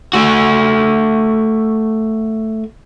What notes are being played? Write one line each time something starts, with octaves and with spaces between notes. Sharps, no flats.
A3 F#4